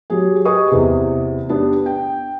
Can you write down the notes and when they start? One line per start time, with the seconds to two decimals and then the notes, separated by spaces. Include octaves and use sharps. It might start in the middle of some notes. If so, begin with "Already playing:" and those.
0.10 F#3 G4 G#4
0.45 G4 G#4 B4 D#5 C#6 D#6
0.71 E2 C3
1.49 B3 D4 G4
1.86 G5